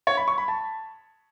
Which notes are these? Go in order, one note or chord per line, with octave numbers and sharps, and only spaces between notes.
C#5
B5
C#6
B5
A5